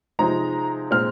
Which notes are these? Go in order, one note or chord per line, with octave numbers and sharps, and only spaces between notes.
C3 F3 G#3 C4 D#4 A#5
A#2 G#3 C4 F6